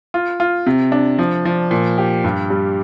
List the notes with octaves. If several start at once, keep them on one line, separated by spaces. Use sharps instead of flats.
F4
F4
C3
D4
F3
F3
A#2
G4
G2
G3